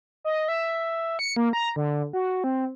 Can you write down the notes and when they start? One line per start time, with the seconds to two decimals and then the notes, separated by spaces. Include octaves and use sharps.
0.24 D#5
0.48 E5
1.19 C#7
1.36 A#3
1.53 A#5
1.76 D3
2.13 F#4
2.44 C4